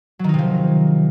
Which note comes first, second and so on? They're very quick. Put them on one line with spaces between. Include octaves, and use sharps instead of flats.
F#3 D#3 D#4 C3 F3